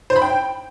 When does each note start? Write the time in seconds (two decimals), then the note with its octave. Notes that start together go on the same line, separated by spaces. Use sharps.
0.10 C5
0.16 B5
0.22 G5